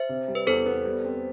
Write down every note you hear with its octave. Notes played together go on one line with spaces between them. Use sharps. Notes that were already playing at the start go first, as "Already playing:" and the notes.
Already playing: C5 E5
C3
G3
B4
E2 A4 C5
B3
G3
C4